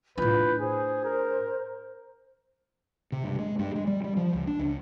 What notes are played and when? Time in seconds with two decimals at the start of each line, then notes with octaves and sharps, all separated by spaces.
0.18 A2 D4 F4 B4 G6
0.60 G#4 C5
1.05 A#4
3.12 C3
3.24 G2
3.39 G#3
3.59 G2
3.75 G#3
3.87 G3
4.04 G3
4.17 F3
4.34 C#2
4.47 D4
4.59 C#2